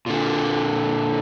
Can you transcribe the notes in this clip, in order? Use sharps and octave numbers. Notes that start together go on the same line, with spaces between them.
A#2 D3